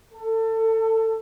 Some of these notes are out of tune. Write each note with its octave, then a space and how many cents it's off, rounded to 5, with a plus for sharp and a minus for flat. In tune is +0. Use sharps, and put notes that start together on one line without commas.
A4 +25